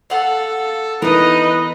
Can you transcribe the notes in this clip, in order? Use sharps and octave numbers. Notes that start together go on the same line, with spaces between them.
A4 F5 F#5
E3 B3 D#4 A#4 B4 D#5